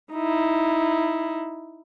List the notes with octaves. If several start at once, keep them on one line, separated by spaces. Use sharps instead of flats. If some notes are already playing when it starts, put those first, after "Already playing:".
D#4 E4